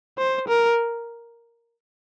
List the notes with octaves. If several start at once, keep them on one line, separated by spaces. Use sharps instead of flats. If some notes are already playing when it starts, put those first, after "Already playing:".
C5
A#4